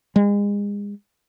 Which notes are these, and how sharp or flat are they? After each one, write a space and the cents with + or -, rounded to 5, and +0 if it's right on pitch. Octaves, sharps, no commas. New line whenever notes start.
G#3 -35